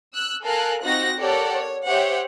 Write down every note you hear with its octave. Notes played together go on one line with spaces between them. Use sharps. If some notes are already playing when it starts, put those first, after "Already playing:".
E6 F#6
A4 A#4 F5 G#5 A5 F#6
C4 D#4 F4 F#4 F#6 A#6
G4 A4 A#4 C#5 D5 F#5
C#5
G4 C5 C#5 E5 F#5